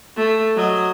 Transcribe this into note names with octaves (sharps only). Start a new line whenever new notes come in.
A3
F#3 D#5